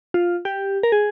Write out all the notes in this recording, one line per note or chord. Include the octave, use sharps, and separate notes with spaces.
F4
G4
A#4
G#4